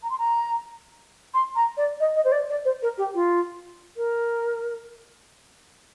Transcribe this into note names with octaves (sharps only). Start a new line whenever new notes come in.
A#5
C6
A#5
C6
A#5
D5
D#5
D#5
C5
D5
D5
C5
A#4
G4
F4
A#4